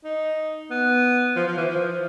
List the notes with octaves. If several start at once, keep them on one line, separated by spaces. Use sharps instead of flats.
D#4
B3
F3
F3
E3
F3